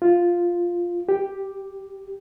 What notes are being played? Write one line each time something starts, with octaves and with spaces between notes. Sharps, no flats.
F4
G4